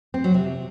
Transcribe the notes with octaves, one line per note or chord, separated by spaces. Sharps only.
C4
F#3
C3